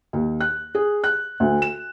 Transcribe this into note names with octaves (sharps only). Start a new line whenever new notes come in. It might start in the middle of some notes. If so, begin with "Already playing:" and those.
D#2
F#6
G#4
F#6
D2
E7